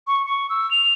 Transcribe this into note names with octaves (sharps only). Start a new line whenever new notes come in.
C#6
C#6
E6
F7